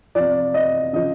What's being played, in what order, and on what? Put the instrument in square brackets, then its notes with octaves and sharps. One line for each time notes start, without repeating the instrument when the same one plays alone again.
[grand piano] C3 F3 D5
D#5
C#3 F3 D#5